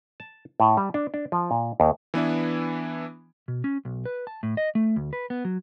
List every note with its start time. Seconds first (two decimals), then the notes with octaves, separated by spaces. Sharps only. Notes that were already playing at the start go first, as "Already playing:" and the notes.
0.20 A5
0.60 A2
0.77 G3
0.94 D4
1.14 D4
1.32 F3
1.51 A#2
1.80 D#2
2.14 E3 B3 D4 E4
3.48 B2
3.64 C#4
3.85 B1
4.06 B4
4.27 A5
4.43 A2
4.57 D#5
4.75 A3
4.96 D2
5.13 B4
5.30 B3
5.45 F#3